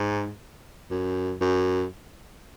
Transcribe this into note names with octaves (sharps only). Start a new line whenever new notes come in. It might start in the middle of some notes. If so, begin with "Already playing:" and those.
Already playing: G#2
F#2
F#2